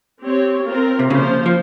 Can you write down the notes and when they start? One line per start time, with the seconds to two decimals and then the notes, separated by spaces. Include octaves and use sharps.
0.23 C4 G4 C#5
0.66 C4 F4 A#4
0.99 C3
1.10 C#3 F3 A#3 F4 C5
1.46 F3